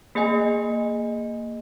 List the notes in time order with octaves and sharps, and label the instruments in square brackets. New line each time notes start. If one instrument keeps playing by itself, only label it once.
[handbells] A#3 G#4 D#5 G#5